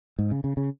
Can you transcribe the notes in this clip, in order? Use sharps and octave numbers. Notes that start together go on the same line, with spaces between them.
G#2
C#3
C#3
C#3